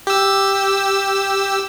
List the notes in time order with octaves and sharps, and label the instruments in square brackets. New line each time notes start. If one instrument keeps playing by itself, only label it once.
[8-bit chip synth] G4 E6